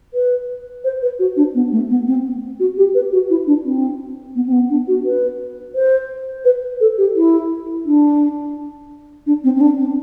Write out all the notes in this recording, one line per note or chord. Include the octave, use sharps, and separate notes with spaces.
B4
C5
B4
F#4
D4
B3
A3
B3
C4
F#4
G4
B4
F#4
E4
D4
C4
B3
C4
B3
D4
F#4
B4
C5
B4
A4
G4
E4
D4
D4
C4
C4
D4
C4